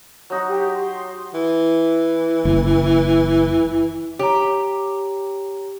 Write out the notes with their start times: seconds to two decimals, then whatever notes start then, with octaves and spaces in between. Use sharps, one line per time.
0.30 F#3 D#4 F#4
0.48 G4
0.76 C6
1.34 E3
2.45 F#1
4.19 G4 C#5 A#5